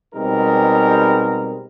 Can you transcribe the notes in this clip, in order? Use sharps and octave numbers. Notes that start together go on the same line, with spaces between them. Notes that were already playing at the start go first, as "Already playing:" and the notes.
B2 G3 G#3 C4 D#4 A#4